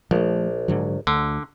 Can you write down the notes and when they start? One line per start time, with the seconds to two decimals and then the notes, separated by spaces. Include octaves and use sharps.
0.11 A#1 F3 G3 A3
0.68 G#2 D3 F#3
1.07 D2 D3